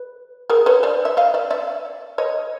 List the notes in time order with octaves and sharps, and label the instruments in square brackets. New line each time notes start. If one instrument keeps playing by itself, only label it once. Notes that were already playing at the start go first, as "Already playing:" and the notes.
Already playing: [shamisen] B4
G#4 A#4
B4 C#5
C5 D5
E5
D#5 F5
D5 E5
D5 E5
C#5 D#5